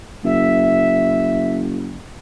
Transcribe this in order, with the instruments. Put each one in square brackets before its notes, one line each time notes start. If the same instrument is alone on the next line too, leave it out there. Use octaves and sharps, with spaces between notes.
[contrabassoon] F#1 [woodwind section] E5